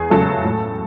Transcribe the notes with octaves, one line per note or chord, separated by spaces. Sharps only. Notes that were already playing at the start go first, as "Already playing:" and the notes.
Already playing: E2 G#4
C#3 F#3 A3 A4
A2